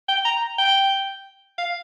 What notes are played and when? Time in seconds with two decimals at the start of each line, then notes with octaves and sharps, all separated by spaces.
0.08 G5
0.25 A#5
0.58 G5
1.58 F5